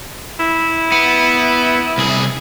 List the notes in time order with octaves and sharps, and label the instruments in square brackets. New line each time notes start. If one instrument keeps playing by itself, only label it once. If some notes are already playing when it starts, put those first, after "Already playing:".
[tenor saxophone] E4
[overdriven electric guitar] B3
C2 G#4